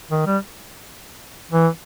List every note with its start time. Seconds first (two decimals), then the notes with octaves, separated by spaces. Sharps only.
0.11 D#3
0.26 G3
1.51 E3